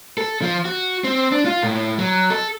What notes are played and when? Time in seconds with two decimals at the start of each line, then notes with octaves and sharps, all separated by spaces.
0.18 A4
0.42 F3
0.65 F#4
1.04 C4
1.32 D4
1.46 F4
1.63 A2
1.99 F#3
2.30 A4